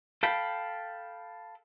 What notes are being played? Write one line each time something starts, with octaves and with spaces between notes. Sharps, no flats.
A4 F5 G5 B5